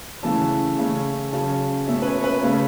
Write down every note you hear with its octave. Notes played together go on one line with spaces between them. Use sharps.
C#3 E3 A3 C#4 A5
C#3 A3 C#4
C#3 F#3 C#4 A5
B2 A3 C#4 E5
B4
C#5
C#5
B4
C#3 A3 C#4